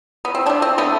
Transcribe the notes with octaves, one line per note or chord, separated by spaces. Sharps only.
B3
C4
D3 A3 D4
C4
D3 A3 B3